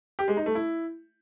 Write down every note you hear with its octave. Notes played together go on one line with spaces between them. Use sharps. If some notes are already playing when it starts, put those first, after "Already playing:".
G4
G#3
D#4
A3
E4